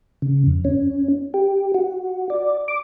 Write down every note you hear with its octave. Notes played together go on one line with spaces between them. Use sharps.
C#3
F2
C#4
G4
F#4
D5
D6